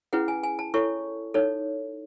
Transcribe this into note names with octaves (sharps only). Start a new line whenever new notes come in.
C#4 E4 G#4 B4 F#5
G#5
G#5
A5
E4 A4 C#5 C#6
D#4 A4 C#5